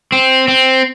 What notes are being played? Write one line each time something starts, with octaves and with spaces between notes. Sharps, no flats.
C4
C4